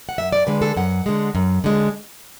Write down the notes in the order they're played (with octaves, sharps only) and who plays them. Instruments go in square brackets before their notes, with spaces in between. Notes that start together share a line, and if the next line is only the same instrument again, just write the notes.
[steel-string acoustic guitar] F#5
F#2 E5
D5
D3 G#3 B4
A4
F#2 F#5
D3 G#3
F#2
D3 G#3